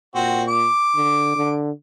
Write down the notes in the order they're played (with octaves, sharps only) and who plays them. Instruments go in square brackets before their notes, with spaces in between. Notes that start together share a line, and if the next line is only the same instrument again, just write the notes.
[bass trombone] A#2 [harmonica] C4 F#4
[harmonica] D6
[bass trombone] D3
D3